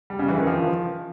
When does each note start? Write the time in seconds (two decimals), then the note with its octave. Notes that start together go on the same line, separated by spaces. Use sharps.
0.10 G3
0.19 C#3
0.28 E3
0.38 D#3
0.47 F3